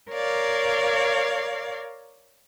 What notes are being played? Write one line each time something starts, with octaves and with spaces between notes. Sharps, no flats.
A#4 C#5 D5 F5